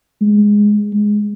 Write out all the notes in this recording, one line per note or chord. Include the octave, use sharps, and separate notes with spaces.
G#3
G#3